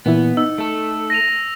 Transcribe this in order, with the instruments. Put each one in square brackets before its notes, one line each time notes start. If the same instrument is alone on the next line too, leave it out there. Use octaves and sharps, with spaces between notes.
[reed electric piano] A#2 E3 E4 [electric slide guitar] B3
[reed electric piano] D#4 [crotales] E6
[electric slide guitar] A3 A4
[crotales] A#6 D#7 F7